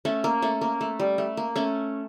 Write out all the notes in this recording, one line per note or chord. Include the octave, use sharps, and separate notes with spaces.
A3 C#4
A#3
A3 C#4
A#3
A3
G3
A3
A#3
A3 C#4